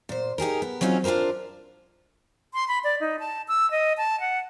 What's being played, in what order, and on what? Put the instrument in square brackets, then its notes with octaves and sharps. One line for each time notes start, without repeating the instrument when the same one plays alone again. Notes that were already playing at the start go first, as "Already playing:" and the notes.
[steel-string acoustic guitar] A#2 C5
D#4 G4 G#4 A#4
B3
F#3 C4 C#4 D#4 F4
D4 F4 G4 A#4 C5
[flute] C6
B5
D5
D#4
A5
E6
D#5
A5
F#5